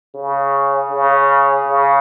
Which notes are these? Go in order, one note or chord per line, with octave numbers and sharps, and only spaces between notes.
C#3
C#3
C#3